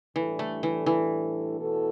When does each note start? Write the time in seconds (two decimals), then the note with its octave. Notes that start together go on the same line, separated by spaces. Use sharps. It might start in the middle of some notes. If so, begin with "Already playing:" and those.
0.16 A2 E3 G3 D4 A4
0.39 A3
0.63 E3
0.86 E3
1.58 B2 B3 E4 A4